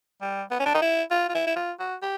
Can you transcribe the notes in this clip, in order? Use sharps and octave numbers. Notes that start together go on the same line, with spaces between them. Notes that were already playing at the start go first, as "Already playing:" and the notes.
G3
B3
C#4
D4
D#4
E4
F4
F4
E4
E4
F4
F#4
G4